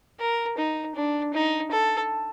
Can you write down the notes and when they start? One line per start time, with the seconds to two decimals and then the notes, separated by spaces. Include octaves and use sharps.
0.20 A#4
0.58 D#4
0.95 D4
1.34 D#4
1.72 A4